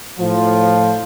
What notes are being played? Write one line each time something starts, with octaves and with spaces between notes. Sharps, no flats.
A2 F3